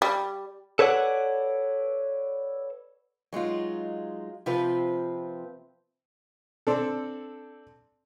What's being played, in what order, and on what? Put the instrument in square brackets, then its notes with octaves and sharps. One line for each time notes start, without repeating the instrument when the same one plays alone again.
[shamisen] G3
[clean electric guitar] A4 B4 C#5 D5 F#5
[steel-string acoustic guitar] F#3 G#3 D#4 F4
C3 F3 C4 F4 B4
[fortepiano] C4 D4 A4